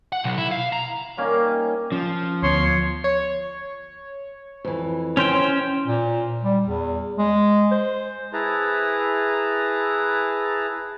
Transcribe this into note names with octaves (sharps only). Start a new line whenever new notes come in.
F#5
B1
E4
F5
A#5
G3 A#3 C#4 D#4
D#5
F3 C#4
D2 B3 C#5 C6
C#5
F2 E3
C#4 C5 G5
A#2
G3
E2
G#3
C5
E4 G#4 B4 A5 A#5